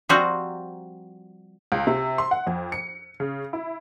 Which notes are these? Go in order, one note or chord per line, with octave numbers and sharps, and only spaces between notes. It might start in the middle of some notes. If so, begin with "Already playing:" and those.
F3 G3 C4 F#4 A#5
C#2
C3
C6
F#5
F2
C#7
C#3
E4